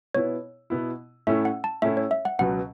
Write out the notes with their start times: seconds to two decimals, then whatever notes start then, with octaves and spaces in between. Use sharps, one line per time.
0.14 B2 B3 E4 C#5
0.70 B2 B3 E4
1.27 A2 A3 C#4 E4 E5
1.45 F#5
1.64 A5
1.82 A2 A3 C#4 E4 E5
1.97 C#5
2.11 E5
2.25 F#5
2.39 C#2 B2 F#3 F#5